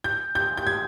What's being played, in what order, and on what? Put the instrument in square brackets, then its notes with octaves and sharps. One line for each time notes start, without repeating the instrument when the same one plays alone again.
[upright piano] G6
G6
G6
G#6